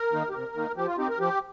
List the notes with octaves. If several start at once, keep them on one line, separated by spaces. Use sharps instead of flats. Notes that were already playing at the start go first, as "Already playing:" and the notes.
Already playing: A#4
D#3 A#3 D#4
G4
C3 A#4
D#3 A#3 D#4
F3 G4
F4
C4 D#4 G4
A#4
F3 G4